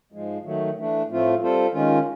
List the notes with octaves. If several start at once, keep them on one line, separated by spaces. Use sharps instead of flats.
G#2 F3 G#3
D#3 F#3 A3
E3 A3 D4
A2 F3 A3 C4 F4
G3 C4 F4 A4 C5
D#3 G#3 C#4 F4